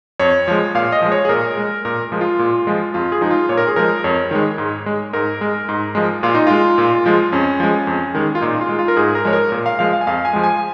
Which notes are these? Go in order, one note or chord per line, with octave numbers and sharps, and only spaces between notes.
F2 C#5
F3 G#3
A#2 F5
D#5
F3 G#3
C#5
G#4
A#2 A#4
G#3
A#2 A#4
F3 G#3
F4
A#2
F3 G#3
F2 F4
G#4
F3 G#3 D#4
F4
A#2 C#5
A#4
G#4
F3 G#3 A#4
F2 C#5
D#3 G#3
G#2
G#3
G#2 A#4
G#3
G#2
F3 G#3
A#2 F4
D#4
G#3 F4
A#2
F3 G#3
F2 C#4
F3 G#3
F2
D#3 G#3
F4
A#2 D#4
F4
G#3
F4
A#4
G#2 G#4
A#4
F3 G#3 C#5
A#4
A#2
F5
F3 G#3 F5
F5
G#5
F2 F5
G#5
F3 G#3
G#5